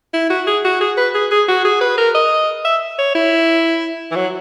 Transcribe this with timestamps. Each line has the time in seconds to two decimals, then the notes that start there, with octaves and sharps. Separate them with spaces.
0.14 E4
0.30 F#4
0.47 G#4
0.65 F#4
0.81 G#4
0.97 B4
1.14 G#4
1.31 G#4
1.48 F#4
1.65 G#4
1.81 B4
1.98 A#4
2.15 D#5
2.65 E5
2.99 C#5
3.15 E4
4.11 E3
4.16 F#3